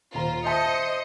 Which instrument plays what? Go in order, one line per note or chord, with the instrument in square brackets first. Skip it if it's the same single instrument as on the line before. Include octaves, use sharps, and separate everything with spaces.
[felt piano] D#1 A#5 [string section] F4 C5
[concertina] C5 [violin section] D#5 [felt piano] E5 A5 B6 [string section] C#7